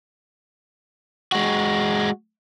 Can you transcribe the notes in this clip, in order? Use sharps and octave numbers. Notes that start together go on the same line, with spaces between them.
G#3 F#4